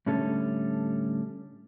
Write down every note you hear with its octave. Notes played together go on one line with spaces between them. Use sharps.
A2 D3 G3 C#4 A4